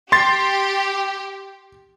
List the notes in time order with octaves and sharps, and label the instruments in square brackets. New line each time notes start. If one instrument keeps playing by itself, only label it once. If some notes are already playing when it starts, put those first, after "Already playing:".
[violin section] G4 [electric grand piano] C6 A6